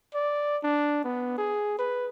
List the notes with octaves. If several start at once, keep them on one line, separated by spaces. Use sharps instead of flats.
D5
D4
B3
G#4
B4